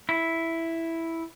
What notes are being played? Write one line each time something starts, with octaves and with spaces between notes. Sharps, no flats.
E4